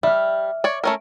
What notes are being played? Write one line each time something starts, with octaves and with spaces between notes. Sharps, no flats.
G3 E5 F6
C#5 D5
A3 C#4 A#4